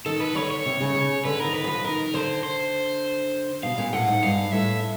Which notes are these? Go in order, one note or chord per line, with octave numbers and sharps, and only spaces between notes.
D#3 A4
B4
D3 C#5
C#5
C3
C#3
C#3
D3 B4
D#3 A#4
B4
F3
B4
D#3 A#4
D3 C5
C5
B2 F5
A#2
A2 F#5
G#2
G2 F5
A2 E5